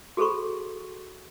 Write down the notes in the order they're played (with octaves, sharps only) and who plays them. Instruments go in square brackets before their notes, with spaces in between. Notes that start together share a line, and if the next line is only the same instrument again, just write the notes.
[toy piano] F#4 G#4 A4 C5 B5 C#6